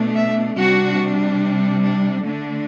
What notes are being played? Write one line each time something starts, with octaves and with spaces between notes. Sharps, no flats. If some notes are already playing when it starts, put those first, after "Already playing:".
Already playing: B2 A3 D4
E5
C3 G3 D4 F#4
D4
D3 A3 D4